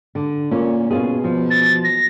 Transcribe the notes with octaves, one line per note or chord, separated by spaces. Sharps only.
D3
A#2 C#4
B2 C#4 F4 G#4
F3
A6
A#6